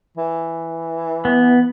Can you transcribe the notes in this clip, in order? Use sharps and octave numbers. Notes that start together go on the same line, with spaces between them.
E3
B3